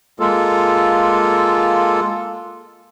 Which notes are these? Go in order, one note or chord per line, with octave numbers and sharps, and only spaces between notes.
G#3 A#3 F4 A4